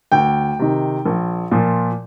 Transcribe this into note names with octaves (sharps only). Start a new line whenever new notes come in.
D2 G5
C3 D#3
A#1
A#2 F3